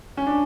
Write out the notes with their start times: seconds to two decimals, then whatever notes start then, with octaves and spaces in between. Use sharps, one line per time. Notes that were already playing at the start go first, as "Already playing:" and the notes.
0.17 C#4
0.27 D4